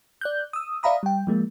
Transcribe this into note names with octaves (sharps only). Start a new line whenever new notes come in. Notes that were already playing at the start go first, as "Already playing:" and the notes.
D5 F#6 G6
D#6 E6
D5 E5 F5 A#5 B5 D#6
G3 G5
F3 G#3 A#3